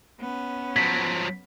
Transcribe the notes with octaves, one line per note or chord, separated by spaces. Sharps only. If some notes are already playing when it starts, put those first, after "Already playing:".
B3 C#4
F3 F#3 B6